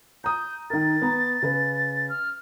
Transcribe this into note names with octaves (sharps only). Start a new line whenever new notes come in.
A#5 D#6 G6
D#3 A#4 A6
B3 A#5
C#3 B4
F6